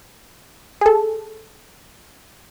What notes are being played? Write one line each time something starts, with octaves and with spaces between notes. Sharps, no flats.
G#4 A4